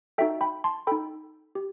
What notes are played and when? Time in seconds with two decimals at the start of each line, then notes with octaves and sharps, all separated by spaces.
0.18 D#4 F#4 A4 E5 G5
0.41 G5 B5
0.64 A5 C6
0.87 D#4 A4 G5 B5
1.55 G4